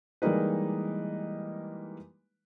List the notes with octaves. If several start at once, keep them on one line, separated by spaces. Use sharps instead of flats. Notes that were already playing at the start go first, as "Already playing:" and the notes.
E3 G3 G#3 A#3 D#4 B4